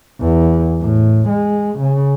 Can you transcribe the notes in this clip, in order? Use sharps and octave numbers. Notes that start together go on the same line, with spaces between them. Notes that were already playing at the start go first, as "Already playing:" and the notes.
E2
A2
G#3
C#3